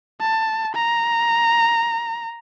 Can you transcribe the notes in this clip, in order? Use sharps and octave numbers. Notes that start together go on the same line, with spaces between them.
A5
A#5